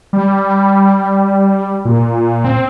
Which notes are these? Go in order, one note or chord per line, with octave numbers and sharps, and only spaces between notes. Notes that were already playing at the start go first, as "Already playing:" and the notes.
G3
A#2
C4